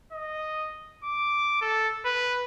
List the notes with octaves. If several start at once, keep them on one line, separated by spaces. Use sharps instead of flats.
D#5
D6
A4
B4